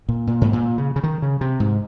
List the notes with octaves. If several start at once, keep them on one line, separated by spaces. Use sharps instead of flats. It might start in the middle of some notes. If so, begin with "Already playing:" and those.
A#2
A#2
G#2
A#2
C#3
C#3
D#3
C#3
C3
G#2